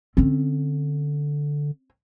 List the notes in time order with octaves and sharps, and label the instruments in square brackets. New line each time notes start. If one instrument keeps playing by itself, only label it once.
[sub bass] D3 [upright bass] C4 C#4